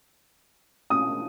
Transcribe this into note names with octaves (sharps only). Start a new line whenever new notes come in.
D#6